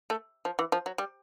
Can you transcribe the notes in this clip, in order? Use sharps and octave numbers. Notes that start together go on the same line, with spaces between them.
A3
F3
E3
F3
F#3
G3